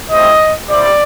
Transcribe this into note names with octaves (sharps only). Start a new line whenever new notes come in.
A3 C4 E4 G4 D#5
G3 C4 E4 G4 D5